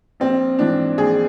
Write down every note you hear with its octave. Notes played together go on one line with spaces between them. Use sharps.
A#1 C4
G#2 E3 D4
A#1 G#4